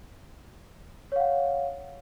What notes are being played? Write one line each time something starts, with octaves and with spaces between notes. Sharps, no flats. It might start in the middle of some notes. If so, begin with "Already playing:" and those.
C#5 F5 F#5